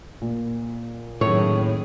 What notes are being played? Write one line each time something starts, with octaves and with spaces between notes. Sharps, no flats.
A#2
F#2 A2 D#3 G#4 C#5